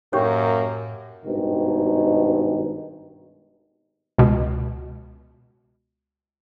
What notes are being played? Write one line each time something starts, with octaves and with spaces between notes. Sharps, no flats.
F#2 A2 A#3 G4 C#5 G5
G#1 G2 B2 D#3
C#2 B2